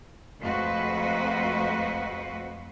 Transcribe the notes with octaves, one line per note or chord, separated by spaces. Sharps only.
F2 G#3 A3 F#4 B4 C5